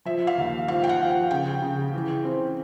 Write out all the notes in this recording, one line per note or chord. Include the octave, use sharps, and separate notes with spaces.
F3 E5
F5
D#2
F3 F5
G5
F#5
F3
F#5
C#3 G5
C#3
E3
C4